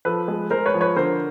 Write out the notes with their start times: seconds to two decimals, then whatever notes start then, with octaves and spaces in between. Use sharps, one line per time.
0.05 F3 A4 B4
0.28 G#3
0.50 G#3 A#4 C5
0.66 B4 C#5
0.74 F3
0.81 B4 C#5
0.96 D3 A#4 C5